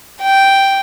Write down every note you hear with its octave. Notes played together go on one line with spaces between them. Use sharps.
G5